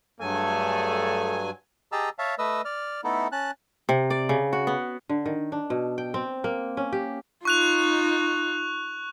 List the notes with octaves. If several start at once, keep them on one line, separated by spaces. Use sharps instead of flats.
G2 F#3 A3 G#4 A4 G#5
G4 G#4 D#5 A5 A#5 E6
C#5 E5 F5 A5
A3 B4 D#5 E6
D5 F6
A3 B3 D#4 E4 A4
C#4 A5 F#6
C3
D5
C#3
F#4
B3
D3
D#3
D4
B2
G5
C4
A#3
C#4
G4
D#4 F4 C#6 F#6 F7